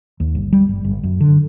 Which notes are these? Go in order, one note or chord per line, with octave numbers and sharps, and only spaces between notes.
D#2
G1
G3
G1
G1
F#2
D3